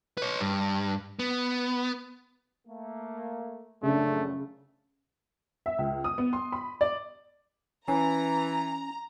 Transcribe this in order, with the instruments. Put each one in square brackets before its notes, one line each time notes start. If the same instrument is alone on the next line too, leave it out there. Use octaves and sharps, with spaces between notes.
[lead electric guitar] B4 C#5
G2
B3
[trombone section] A3 A#3
[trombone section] A#1 F#2 [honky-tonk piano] C#3 [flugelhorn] A3 [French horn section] D4
[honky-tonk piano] E5
C#2
D#6
B3
C6
B5
D5
[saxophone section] E3 [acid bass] C#4 [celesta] G#5 [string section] A#5